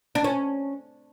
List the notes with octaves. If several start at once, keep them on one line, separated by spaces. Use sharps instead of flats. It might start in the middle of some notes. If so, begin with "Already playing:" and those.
D4
C#4